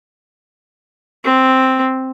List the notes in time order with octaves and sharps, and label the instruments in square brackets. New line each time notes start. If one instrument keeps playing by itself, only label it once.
[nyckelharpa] C4